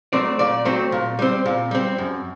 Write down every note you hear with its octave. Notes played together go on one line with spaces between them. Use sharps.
F#3 A3 C4 D5
A#2 D5
F#3 A3 C4
A#2
G3 C4
A#2
G3 C4
F#2